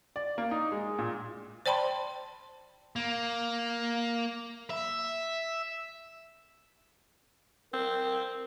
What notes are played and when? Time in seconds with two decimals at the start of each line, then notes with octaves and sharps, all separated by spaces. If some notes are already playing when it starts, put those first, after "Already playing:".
0.16 D5
0.38 A#3
0.51 D#4
0.72 G#3
0.99 A#2
1.66 C5 D5 G5 A5 B5 C6
2.96 A#3
4.70 E5
7.73 C4 A#4